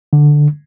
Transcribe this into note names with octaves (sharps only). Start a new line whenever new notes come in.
D3